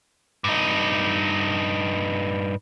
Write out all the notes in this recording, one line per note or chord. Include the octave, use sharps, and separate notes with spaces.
G2 D#4